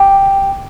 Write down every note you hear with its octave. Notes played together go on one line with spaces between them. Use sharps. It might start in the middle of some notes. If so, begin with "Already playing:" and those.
Already playing: G4